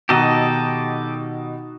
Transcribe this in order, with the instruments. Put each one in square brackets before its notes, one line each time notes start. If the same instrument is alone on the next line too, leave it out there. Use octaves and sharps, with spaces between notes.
[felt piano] B2 D#3 [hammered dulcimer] D#4 F#4 [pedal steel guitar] G4 A4 D#5